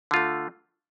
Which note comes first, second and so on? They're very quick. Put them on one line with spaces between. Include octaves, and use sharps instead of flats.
D3 F4 A3